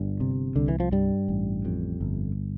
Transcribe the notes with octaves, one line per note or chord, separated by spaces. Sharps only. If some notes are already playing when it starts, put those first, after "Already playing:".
Already playing: G1 G2
C3
C2 D3
E3
F3
G2 G3
A1
F2
G1